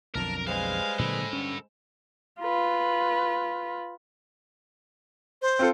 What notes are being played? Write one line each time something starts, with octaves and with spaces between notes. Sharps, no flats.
B1 F2 D3 A#4 A5 A#5
G3 G#3 G#4 B4 C5 F5
A#2 D3 F#3 A4 B5
G2 D3 G3 C#4
F4 B4
C5
C4 F4 A4